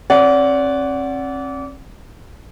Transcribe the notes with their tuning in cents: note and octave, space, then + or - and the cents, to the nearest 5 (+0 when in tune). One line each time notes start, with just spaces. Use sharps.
C4 +45 D5 -30 F#5 +0